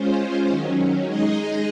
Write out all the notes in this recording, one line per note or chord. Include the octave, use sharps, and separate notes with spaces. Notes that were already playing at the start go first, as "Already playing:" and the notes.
Already playing: G#3 C#4 F4 C5
D#3 F#3 C#4
G#3 D#4 G#4 D#5